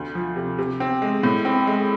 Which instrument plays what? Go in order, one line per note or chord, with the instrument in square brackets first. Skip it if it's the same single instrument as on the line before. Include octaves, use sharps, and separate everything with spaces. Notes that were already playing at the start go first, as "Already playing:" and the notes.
Already playing: [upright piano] D2
F3
C3
C3
C4
G#3
A2
C4
G#3